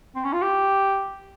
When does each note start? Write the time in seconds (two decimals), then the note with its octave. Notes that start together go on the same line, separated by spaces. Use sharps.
0.16 C4
0.25 C#4
0.33 F4
0.42 G4